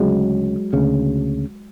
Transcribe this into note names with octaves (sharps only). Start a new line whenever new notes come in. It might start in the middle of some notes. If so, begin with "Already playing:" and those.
Already playing: D2 C#3 F#3 G#3
D2 C#3